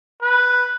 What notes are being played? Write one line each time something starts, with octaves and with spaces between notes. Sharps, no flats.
B4